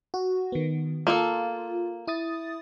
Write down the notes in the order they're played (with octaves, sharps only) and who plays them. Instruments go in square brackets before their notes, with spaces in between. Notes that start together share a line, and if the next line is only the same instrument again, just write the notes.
[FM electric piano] F#4
D#3 B3
[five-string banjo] A#3 A4 [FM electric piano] F4
[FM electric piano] E4 D#6 A6